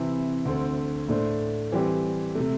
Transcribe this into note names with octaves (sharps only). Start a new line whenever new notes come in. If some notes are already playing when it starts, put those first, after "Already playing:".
Already playing: C3 E3 C4 E4
D2 D3 C4 A4
A2 A3 D4 C5
E3 G3 C4 G4
C3 A3